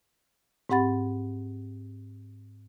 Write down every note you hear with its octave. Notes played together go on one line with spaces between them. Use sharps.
G#2 C4 G4 F#5 B5 A6